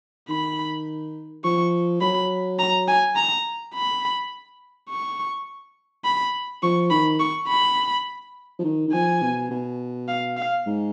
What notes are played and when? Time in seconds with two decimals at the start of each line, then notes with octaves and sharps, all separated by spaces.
0.29 D#3 B5
1.44 F3 C#6
2.01 F#3 B5
2.59 A#5
2.88 G#5
3.16 A#5
3.75 B5
4.90 C#6
6.04 B5
6.63 F3 C#6
6.91 D#3 B5
7.20 C#6
7.48 B5
8.59 F3
8.64 D#3
8.88 D#3
8.93 F3 G#5
9.22 B2
9.50 B2
10.08 F5
10.37 F5
10.66 G#2